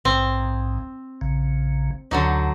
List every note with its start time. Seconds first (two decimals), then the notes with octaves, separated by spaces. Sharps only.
0.05 A#1 G#2 C4
1.21 A#1 C#3
2.11 D2 D3 F#3 D#4